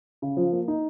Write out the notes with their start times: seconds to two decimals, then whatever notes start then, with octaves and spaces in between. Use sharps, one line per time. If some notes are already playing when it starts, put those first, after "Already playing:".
0.22 C#3
0.37 F3
0.52 A#3
0.68 D#4